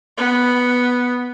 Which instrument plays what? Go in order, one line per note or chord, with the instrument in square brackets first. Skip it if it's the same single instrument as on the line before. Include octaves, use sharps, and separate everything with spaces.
[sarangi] B3